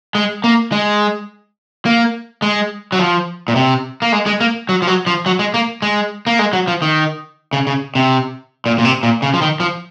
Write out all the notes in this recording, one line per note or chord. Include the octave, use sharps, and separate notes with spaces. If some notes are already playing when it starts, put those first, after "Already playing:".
G#3
A#3
G#3
A#3
G#3
F#3
F3
A#2
C3
A#3
G#3
G#3
A#3
F#3
F3
F#3
F3
F#3
G#3
A#3
G#3
A#3
G#3
F#3
F3
D#3
C#3
C#3
C3
A#2
A#2
C3
A#2
C#3
F3
D#3
F3